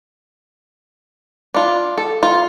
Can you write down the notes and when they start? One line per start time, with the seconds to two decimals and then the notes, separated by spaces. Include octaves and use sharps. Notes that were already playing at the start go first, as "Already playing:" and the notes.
1.54 D4 F4
1.98 A4
2.23 F4